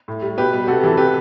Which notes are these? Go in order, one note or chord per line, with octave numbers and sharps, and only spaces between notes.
A2
G3
B2 G4 B4
G3
C3 F#4 A4
E3 G3 A4
C3 G4 B4